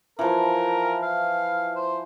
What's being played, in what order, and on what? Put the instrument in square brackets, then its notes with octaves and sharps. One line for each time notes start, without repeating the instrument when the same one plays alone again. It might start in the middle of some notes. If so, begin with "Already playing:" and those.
[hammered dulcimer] E3 F3 [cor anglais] A#4
[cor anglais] F5
C5